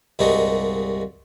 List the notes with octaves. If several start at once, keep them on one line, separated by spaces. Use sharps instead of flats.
C2 G2 A#2 G#3 D#4 F#4